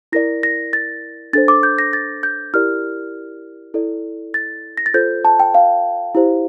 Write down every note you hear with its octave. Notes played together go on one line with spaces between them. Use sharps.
E4 A#4 D5 A#6
A#6
A6
D4 A4 C5 A6
D6
G6
A#6
A6
G6
E4 G4 A#4 D5 F6
E4 A4 D5
A6
A#6
A6
F4 A4 C5 G6
A5
G5
F5
E4 G4 C5